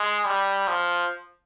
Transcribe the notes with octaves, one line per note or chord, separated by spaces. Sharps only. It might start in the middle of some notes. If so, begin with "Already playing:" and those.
Already playing: G#3
G3
F3